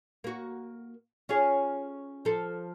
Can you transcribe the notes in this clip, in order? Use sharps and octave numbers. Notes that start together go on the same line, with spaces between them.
A#3 F#4
C#4 F4 G#4
F3 A4